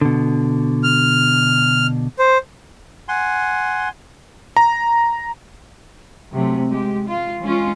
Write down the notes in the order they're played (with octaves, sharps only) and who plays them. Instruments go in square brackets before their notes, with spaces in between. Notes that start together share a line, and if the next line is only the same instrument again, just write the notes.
[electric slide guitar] B2 D3
[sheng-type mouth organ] F6
C5
[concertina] F#5 G#5 C6
[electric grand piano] A#5
[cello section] C3 F#3 A3
G#3 G4
F4
E3 G#3 C#4 F4